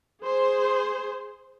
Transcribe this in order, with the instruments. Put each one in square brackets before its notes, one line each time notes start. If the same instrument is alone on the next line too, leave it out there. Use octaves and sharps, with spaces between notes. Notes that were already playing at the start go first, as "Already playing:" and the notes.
[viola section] G#4 C5